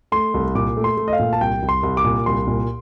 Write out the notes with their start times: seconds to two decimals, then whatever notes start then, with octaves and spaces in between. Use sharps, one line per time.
0.12 A3 C6
0.34 C2
0.55 A#2 D6
0.77 A3
0.84 C6
0.97 A3
1.08 D#5
1.13 F5
1.19 A#2
1.33 A5
1.41 C2 G5
1.62 C2
1.69 C6
1.83 C2
1.97 D6
2.04 A#2
2.26 C2 C6
2.47 A#2